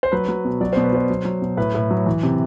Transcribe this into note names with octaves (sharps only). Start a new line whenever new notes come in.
C5
F#3 B4
F#3
B2
F#3 D5
B2 C5
B4
F#3 C5
F#3
F#3
B2
A2 B4
A2
F#3
E3
C3